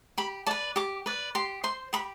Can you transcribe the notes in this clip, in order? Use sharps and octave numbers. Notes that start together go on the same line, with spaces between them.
G4 B5
B4 D5 A5
G4 D6
B4 D5
G4 C6
C5 C6
G4 B5